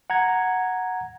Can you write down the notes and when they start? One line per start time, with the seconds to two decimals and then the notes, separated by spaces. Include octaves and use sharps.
0.10 F#5 A#5 G#6